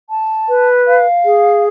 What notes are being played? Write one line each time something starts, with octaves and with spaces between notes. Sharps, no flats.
A5
B4
F5
G#4